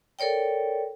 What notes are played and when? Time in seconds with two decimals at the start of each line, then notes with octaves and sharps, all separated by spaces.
0.19 A4 A#4 C#5 D5 G5